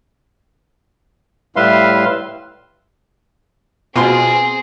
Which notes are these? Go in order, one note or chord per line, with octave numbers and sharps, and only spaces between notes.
A2 G3 B4 E5 F5 C6
B2 C4 F4 G#4 G#5 C6